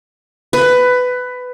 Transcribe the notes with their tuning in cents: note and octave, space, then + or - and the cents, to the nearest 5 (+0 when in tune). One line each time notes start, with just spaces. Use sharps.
B4 +15